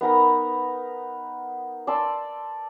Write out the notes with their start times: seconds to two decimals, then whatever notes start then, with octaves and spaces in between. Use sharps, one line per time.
0.01 B3 D#4 A#4 A#5
1.87 D5 A5 C6 E6